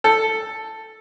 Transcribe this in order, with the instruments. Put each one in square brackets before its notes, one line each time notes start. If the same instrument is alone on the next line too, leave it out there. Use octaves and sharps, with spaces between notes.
[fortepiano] A4